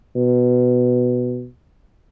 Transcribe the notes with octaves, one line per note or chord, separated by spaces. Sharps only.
B2